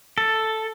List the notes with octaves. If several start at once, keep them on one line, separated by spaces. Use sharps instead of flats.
A4